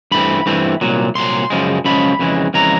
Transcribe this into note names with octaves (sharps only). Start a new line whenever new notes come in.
G2 E3 A3 C4 B5
G2 E3 A3 C4
C2 A#2 F#3
C2 A#2 F#3 C6
F#2 C#3 F3 G#3
F#2 C#3 F3 G#3 B5
F2 C#3 E3 G#3
F2 C#3 E3 G#3 A#5